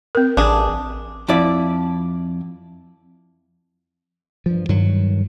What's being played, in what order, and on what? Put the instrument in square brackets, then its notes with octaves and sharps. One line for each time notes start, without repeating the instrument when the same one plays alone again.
[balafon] C4 A#4
[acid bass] A1 [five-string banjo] D4 G#4 [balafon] A5
[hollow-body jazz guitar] F2 E4 D5
[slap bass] G2 F3
G2 D#3 F#3